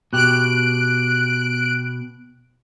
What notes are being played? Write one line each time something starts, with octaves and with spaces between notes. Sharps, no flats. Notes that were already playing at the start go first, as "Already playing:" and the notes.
B2 G4 F#6 D7